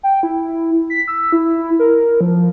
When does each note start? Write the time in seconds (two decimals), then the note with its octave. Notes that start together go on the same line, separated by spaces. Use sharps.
0.03 G5
0.23 E4
0.90 B6
1.08 E6
1.32 E4
1.79 A#4
2.21 F3